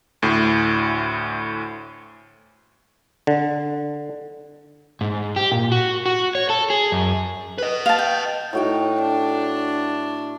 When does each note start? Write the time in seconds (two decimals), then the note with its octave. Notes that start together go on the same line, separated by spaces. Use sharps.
0.22 D2 A2
3.27 D3
5.01 G#2
5.36 G4
5.52 A#2
5.72 F#4
6.06 F#4
6.35 C#5
6.50 A4
6.70 G#4
6.92 F#2
7.58 B4 D#5
7.86 F5 A5
7.99 G5
8.53 A2 D#4 F#4 G5
9.02 D4